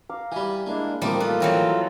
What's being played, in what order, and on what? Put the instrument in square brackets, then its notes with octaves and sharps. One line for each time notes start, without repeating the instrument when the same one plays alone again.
[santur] F5 A#5 D6
[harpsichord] E3 G3 [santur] G#5 B5
[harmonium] G#3 D4 E4 [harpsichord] A#3
[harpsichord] A1 D#3 A#3 [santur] F3 A#5 C6 [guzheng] G3 [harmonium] C4
[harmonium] F4 A4 [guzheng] B4
[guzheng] E3 F#3 D#4 [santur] C4 E4